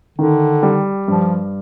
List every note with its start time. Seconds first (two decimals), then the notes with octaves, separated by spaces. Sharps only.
0.18 D3 D#3
0.63 G3
1.08 G2 F3